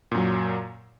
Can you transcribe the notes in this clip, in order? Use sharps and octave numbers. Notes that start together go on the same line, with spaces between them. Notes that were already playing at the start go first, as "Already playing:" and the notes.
F#2 A#2 F#3